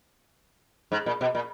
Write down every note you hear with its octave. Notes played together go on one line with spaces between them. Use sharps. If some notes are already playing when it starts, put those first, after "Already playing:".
G#2
A#2
B2
A#2